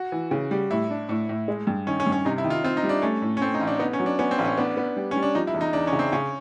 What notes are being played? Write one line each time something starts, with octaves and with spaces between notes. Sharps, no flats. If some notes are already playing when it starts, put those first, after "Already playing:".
Already playing: F#4
E3
C#3
G3
A2 E4
D4
A2
A2
G#3
G2
D#3 C#4
C#4
G2
C#4
C3 D#4
E4
D#3
F4
C4 F4
D#4
G3
D4
A3 C#4
A2
C#4
A3 C4
D#4
A1
D4
B3 D#4
C#4
F#3
D4
B3 C#4
C4
A1
C#4
B3 D4
B3
G3
G3 C#4
D4
F3 D#4
E4
E2
D#4
E2 D4
C#4
C#3
C4
C#3 C#4